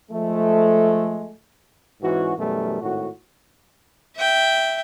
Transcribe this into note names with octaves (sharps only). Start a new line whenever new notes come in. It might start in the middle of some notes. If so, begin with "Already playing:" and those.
F3 G#3 A3
G#2 E3 C#4 F#4
F#2 B2 E3 G3 A3
G#1 A2 F#4
E5 G5